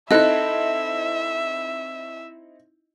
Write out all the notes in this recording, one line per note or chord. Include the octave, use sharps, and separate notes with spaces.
C4 D#4 E4 A4 D#5 E5 F#6